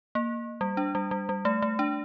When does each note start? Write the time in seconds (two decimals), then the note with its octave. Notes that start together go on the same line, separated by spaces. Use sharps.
0.15 A#3
0.61 G3
0.77 D4
0.95 G3
1.11 G3
1.29 G3
1.45 A3
1.62 A3
1.79 D4